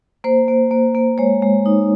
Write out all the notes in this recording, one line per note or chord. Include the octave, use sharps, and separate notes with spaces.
A#3 C5
A#3
A#3
A#3
G#3 C#5
G#3
D#4